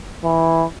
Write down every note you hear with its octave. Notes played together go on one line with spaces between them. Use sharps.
E3